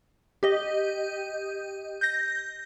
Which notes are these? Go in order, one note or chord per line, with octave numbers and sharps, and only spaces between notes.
G4 D#5
G6 A#6